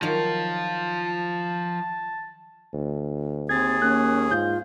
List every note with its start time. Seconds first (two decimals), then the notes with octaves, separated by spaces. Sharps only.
0.02 D#3 F3 F#3 F4 F5 A5
2.73 D2
3.49 D#2 C4 G#4 G#6 A6
3.82 A#3 C#4 F#6
4.31 G#2 F4 G6